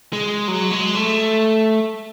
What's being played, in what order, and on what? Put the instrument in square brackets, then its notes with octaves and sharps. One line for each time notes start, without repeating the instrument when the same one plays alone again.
[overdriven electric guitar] G#3
F#3
G#3
A3